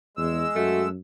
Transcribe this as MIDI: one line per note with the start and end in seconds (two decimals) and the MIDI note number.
0.17 0.44 40
0.17 0.89 56
0.17 0.89 88
0.56 0.97 42
0.56 0.86 57
0.56 0.84 66